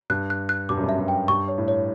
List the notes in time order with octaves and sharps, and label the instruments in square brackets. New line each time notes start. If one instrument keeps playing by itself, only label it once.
[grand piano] G2 [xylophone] F#6
[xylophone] F#6
F#6
[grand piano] G2 [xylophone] D6
[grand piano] F#2
G2
[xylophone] E5
[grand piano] G2
[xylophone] G5
[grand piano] G2 [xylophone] C#6
[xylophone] C#5
[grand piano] A2
[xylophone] C#5